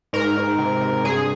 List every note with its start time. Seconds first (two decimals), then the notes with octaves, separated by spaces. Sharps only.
0.13 G#2 A#4
0.36 G#2
0.58 C3
0.81 C3
1.04 G2 G#4